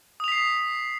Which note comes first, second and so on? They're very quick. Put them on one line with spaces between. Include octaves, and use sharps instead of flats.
D#6 F7 B6 C7